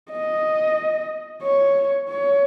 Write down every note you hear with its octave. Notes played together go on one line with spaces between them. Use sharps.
D#5
C#5
C#5